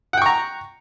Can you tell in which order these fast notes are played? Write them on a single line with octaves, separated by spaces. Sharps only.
F#5 G5 C#6 A#5